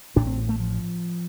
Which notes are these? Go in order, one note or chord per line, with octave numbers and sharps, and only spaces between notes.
A1 A2 D4
C4
A3
F3